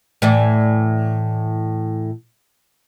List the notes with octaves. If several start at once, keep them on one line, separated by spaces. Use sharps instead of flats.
A2 E3 D5